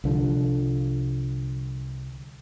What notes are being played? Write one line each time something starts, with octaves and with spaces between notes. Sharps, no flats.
C2 D3 F3